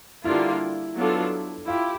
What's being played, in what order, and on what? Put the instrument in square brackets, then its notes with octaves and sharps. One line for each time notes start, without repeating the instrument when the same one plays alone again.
[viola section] D3 G3 A#3 D4 F4 [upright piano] E4
[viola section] F#3 B3 D4 F4 A4
[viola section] E4 G4 [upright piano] F4